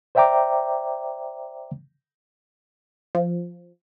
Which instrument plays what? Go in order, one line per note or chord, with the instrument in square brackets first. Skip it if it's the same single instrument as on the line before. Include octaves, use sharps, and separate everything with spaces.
[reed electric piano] C5 D5 E5 G5 A#5 D6
[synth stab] F3